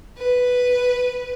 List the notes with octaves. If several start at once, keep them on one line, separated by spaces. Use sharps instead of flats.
B4